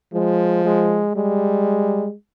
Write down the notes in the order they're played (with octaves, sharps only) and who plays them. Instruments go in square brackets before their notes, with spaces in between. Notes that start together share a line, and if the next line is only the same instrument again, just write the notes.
[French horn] F3 [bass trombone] G#3
[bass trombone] G#3
[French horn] G3 [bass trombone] G#3